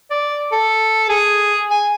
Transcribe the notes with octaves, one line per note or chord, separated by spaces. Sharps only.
D5
A4
G#4
G#5